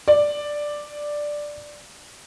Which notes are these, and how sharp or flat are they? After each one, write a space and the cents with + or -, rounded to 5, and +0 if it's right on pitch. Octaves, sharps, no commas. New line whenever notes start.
D5 +5